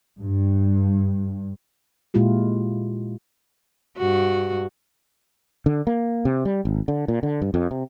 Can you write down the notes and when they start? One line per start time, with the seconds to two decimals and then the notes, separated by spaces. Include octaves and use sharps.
0.19 G2
2.14 A#2 G#3 E4 F4 G4
3.98 G2 F#4
5.66 D3
5.87 A#3
6.25 C3
6.45 G3
6.65 G#1
6.88 D3
7.08 A#2
7.23 D3
7.42 G2
7.54 F2
7.71 C3